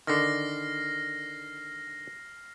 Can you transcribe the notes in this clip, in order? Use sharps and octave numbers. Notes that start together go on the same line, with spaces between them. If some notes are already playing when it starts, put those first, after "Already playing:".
D3 D#3 F6 A#6 C7